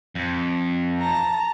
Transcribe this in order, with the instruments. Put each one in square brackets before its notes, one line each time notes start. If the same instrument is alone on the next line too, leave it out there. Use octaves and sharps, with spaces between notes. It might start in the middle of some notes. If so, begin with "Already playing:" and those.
[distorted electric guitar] F2
[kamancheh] A5 A#5